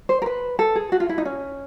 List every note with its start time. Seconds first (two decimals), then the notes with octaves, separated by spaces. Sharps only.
0.09 C5
0.22 A#4
0.26 B4
0.59 A4
0.76 G#4
0.92 F#4
1.00 F4
1.09 E4
1.18 D#4
1.25 C#4